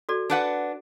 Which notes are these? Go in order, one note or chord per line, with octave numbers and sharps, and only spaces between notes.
F#4 A4 D5
D4 B4 F#5